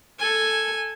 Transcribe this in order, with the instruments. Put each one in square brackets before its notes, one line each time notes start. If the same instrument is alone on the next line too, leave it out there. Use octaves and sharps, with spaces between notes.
[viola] A4 G#5